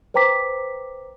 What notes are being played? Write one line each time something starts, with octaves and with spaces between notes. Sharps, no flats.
B4 C5 G5 A#5 D6 B6